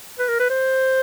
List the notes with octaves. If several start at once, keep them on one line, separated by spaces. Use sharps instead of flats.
B4
A#4
B4
C5